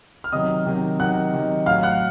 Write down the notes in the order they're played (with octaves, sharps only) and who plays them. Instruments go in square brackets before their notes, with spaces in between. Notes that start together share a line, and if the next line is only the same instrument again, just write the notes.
[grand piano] F6
C3 D#3 F#3 D#5 D#6
C3 D#3 F#3
C3 D#3 F#3 F#5 F#6
C3 D#3 F#3
A2 F#3 F5 F6
F#5 F#6